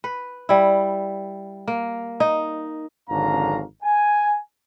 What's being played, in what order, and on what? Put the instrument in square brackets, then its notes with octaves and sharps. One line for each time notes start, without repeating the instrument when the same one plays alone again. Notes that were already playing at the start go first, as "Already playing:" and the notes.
[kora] B4
G3 E4
A#3
D#4
[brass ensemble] G#1 F2 D3 C#4 F5 A#5
G#5